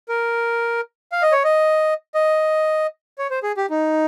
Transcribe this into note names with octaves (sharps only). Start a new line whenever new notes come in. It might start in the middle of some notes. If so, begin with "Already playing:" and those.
A#4
F5
D#5
C#5
D#5
D#5
C#5
C5
G#4
G4
D#4